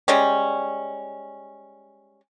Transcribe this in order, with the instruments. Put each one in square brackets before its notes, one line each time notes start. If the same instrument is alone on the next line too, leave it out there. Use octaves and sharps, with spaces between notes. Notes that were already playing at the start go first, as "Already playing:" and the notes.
[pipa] G3 G#3 C#4